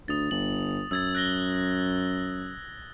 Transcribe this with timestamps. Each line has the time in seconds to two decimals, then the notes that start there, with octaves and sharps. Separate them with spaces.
0.08 D2 D#6 A6
0.31 G1 F#7
0.91 F#2 E6 G#6 A6
1.15 F#6 A#6 G7